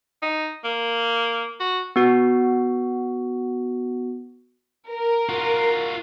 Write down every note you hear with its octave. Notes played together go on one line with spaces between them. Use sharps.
D#4
A#3
F#4
B3 F#4
A#4
F4 F#4